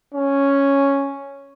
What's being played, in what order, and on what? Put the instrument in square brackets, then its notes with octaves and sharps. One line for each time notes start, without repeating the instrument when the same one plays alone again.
[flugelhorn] C#4